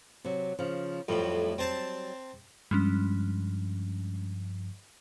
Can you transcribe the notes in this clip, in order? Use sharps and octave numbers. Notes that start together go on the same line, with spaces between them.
C3 F#3
C#3 F3
F2 A2 F#3 G3
C4 C5 A5
G2 F3 G3 G#3 C#4